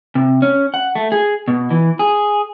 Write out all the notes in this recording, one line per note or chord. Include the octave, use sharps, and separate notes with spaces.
C3
C#4
F#5
A3
G#4
B2
E3
G#4